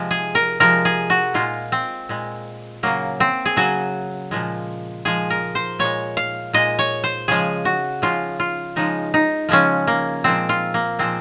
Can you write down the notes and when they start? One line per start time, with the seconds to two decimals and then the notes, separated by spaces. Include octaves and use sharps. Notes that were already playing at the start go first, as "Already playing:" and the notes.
Already playing: C3 F3 G#3
0.11 G#4
0.35 A#4
0.60 C3 F3 G#3 A#4
0.85 G#4
1.10 F#4
1.34 A#2 G#3 F4
1.72 C4
2.09 A#2 G#3
2.83 C#3 F#3 A#3
3.20 C4
3.45 G#4
3.56 C#3 F#3 F#4
4.31 A#2 F3 G#3
5.05 A#2 F3 G#3 G#4
5.30 A#4
5.55 C5
5.79 A#2 G#3 C#5
6.17 F5
6.53 A#2 G#3 D#5
6.79 C#5
7.04 C5
7.28 C#3 F3 G#3 G#4
7.65 F#4
8.02 C#3 F3 G#3 F4
8.40 F4
8.76 C#3 F3 G#3 D#4
9.14 D#4
9.49 C#3 F3 G#3 C#4
9.87 A#3
10.24 A#2 F3 G#3 C4
10.49 F4
10.74 A#3
10.99 A#2 F3 G#3 C4